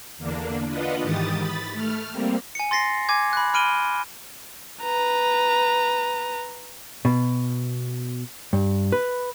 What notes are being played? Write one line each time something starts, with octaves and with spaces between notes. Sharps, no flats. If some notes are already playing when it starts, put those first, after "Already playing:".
E2 D3 A#3 D4
D4 F4 B4 D#5 F#5
G#2 D#3 E3 G4 D#6 A6
B5 A6
A3 F6
G3 A#3 C4
G#5 C#7
C6 A6 A#6 C7
G#5 D6 G#6
B5 F#6
B5 F6 D7 D#7 G7
B4 A#5
B2
G2
B4